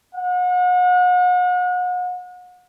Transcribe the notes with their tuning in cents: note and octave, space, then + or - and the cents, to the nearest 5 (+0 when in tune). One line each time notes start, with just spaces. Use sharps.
F#5 -40